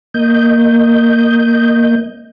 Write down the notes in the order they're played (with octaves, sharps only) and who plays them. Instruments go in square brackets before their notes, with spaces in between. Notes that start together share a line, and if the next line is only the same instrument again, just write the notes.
[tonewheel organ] A#3 D#5 G6